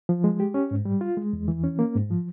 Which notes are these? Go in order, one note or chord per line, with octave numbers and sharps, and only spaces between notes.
F3
G#3
G4
C#4
G#2
G3
F4
G#3
E2
E3
C#4
A#3
G#2
F3